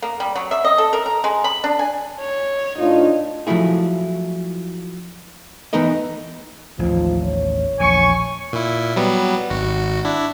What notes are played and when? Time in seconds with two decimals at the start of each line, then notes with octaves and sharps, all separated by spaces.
0.02 A#3
0.20 G3
0.35 F#3
0.51 E5
0.64 D#5
0.78 A4
0.93 A#4
1.06 A#5
1.24 G#3
1.44 B5
1.64 D4
1.79 G#5
2.20 C#5
2.79 A2 D4 D#4 F4
3.47 F3 F#3 A3 E4 G#4
5.73 E3 B3 D#4 A#4 D#5
6.79 A1 D#2 F3
7.24 C#5
7.80 A#1 E2 G#5 C#6
8.53 A#2 E4
8.96 F#3 G3 B3
9.50 G#1 F#4
10.05 D4 E4